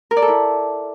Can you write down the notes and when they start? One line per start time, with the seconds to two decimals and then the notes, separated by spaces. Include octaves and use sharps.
0.11 A#4
0.17 D5
0.22 A4
0.28 E4